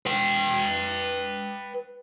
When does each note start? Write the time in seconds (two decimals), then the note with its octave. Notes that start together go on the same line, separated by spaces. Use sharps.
0.07 B4 G5